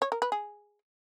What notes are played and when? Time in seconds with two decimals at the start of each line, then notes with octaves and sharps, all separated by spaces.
0.02 C#5
0.12 A#4
0.22 B4
0.32 G#4